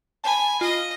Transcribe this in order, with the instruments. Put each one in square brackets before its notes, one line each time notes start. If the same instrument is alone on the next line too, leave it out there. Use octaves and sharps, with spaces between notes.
[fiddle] G#5 [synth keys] A5 B5
[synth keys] F4 [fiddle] D#5